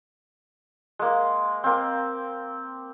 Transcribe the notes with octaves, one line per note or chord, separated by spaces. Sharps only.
G#3 A#3
A#3 C4